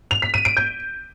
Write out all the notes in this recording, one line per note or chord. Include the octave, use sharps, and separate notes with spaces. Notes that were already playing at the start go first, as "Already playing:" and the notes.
F7
B6
D#7
D7
G6